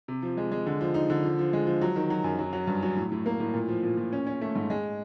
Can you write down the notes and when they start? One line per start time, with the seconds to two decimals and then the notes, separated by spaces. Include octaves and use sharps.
0.08 C3
0.22 F3
0.37 G#3
0.52 G#3
0.66 D3
0.81 F3
0.94 D#4
1.10 D3
1.23 F3
1.39 F3
1.53 G#3
1.67 F3
1.82 F#3
1.96 D#3
2.10 F#3
2.24 F#2
2.39 F#3
2.53 F#3
2.67 G2
2.83 F#3
2.97 A2
3.12 A2
3.26 A#3
3.40 A2
3.54 A#2
3.68 F3
3.83 A#2
3.97 A#2
4.13 C#4
4.27 C#4
4.41 A3
4.55 G#2
4.70 G#3